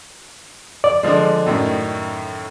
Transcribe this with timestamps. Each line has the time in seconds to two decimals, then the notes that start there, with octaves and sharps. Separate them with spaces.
0.84 D5
1.03 D3 F3 G#3
1.46 F#2 A2 D#3